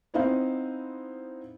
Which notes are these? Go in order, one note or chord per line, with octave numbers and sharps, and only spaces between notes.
B3 C4 D#4 E4 C5 F5